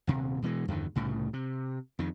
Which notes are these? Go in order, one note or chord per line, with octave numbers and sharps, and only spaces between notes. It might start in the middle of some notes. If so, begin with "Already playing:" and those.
D#1 C3
B2 E3 G3 G#3
E2 G2 D3 D#3
C2 A2 C#3
C3
F2 D#3